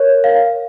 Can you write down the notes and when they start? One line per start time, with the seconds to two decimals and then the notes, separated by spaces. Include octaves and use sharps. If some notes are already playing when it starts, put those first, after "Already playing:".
Already playing: A#4 C#5
0.24 F5